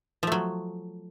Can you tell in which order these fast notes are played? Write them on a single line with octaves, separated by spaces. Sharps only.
F3 A3 F#3